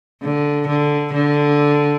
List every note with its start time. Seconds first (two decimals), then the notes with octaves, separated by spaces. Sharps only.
0.22 D3
0.68 D3
1.13 D3